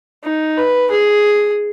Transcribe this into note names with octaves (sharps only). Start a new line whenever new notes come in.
D#4
B4
G#4